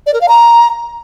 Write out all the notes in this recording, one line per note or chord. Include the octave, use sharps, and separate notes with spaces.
D5
A#4
F5
A#5